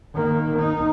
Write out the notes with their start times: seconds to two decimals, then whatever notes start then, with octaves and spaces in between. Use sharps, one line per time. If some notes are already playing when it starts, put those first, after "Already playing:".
0.14 D#3 A#3
0.59 D#4